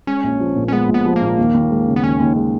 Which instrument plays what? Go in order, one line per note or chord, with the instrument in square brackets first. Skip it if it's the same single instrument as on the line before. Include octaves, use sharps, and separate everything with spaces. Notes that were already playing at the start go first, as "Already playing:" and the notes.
[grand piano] G#3 [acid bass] C#4
[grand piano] A#1
F3
A#2
[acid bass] C#4
[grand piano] G#3 [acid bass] B3
[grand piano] A#1
[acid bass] B3
[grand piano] F3
[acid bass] A#3
[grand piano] A#2
D#2
D#2
G#3
C#3
[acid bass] B3
[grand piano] D#2 [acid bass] C#4
[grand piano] D#2
G#3